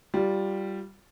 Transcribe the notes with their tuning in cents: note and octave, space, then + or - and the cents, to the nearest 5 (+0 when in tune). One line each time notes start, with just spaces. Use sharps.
G3 -10 F4 +0